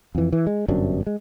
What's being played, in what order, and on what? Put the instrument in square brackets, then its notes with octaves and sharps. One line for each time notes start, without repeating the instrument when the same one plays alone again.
[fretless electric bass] F2 E3
E3
G#3
G1 F#2 C3 D4
G#3